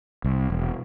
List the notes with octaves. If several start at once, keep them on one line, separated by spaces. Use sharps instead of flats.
C2
E1